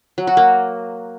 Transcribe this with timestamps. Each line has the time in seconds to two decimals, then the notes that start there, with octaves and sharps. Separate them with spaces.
0.18 F#3
0.27 F#4
0.37 A#3